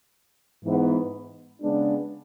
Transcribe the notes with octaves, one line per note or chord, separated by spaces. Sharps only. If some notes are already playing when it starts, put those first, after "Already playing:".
G#2 E3 B3
C#3 G#3 B3 D4